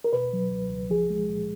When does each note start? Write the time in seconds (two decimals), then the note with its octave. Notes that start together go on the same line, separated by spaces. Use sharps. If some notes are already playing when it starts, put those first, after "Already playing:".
0.04 A#4
0.13 B2 B4
0.33 F#3
0.51 C#2
0.71 C#2
0.90 F3 G#4
1.10 G#3
1.29 A#2